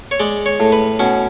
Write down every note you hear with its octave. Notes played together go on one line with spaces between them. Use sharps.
C#5
G#3 D5
C#5
A2
B4
B2 C#4